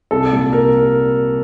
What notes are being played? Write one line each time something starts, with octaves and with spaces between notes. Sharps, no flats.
C2 A4
A#2 G3
C2 A#4